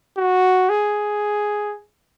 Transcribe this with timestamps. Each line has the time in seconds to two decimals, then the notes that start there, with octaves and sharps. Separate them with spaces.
0.17 F#4
0.69 G#4